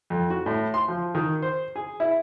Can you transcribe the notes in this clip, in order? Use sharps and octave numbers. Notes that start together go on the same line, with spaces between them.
F2
F#4
A2
C6
F3
D#3
C5
G#4
E4